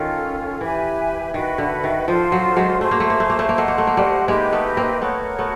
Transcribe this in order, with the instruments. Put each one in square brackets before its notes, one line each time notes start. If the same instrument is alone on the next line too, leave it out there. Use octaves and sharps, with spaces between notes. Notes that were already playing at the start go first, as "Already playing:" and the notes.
Already playing: [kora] D#3 [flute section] C#4 F4 A4
[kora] E3 [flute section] G4 B4 E5 G#5
[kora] D#3 [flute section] F#4 B4 E5
[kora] D3
D#3
[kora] F3 [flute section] D4 F4 A4 C5
[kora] F#3
F#3 G#3
[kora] A3 [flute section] G#4 C5 E5
[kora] A#3
A3
A#3
A3
A#3
A3
A#3
[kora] A3 [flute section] C5 D#5 F#5 A5
[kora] A#3
A3
A#3
G3 A3
[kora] G#3 A#3 [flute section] D#4 G4 B4 D#5
[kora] A3 B3
A#3 C4
[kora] A3 B3 [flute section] F#4 A#4 C#5
[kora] A3 B3